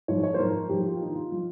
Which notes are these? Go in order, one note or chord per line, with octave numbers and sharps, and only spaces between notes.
G#2 F3 C#5
C#5
C5
G#2 F3 A#4
G#2 F3 G4
G4
F4
G2 D#3 D#4
F4
F3 F4